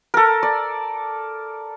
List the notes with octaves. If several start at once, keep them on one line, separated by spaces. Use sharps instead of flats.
A4 A#4
D5